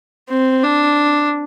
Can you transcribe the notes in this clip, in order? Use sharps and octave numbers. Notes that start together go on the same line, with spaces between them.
C4
D4